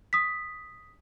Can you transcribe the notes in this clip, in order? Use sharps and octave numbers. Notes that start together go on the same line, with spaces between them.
D#6 B6